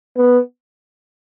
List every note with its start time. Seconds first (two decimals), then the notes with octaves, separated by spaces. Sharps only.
0.17 B3